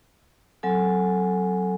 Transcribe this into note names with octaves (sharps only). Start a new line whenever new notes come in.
F#3 C4 A4 G#5